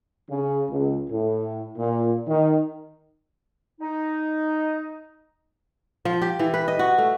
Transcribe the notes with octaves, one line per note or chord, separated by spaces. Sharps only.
C#3
C#2
A2
A#2
D#3
D#4
F3
G4
E3
B4
D#5
F#4
A3